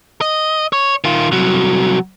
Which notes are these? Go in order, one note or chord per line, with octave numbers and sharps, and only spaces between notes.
D#5
C#5
D#3 F4
C2 F#3